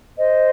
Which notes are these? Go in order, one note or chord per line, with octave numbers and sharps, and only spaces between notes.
C5 D#5